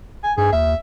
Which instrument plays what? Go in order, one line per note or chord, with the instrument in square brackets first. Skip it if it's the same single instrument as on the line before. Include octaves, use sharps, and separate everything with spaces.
[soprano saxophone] G#5
[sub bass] G2 [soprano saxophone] G#4
[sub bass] D#2 [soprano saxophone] E5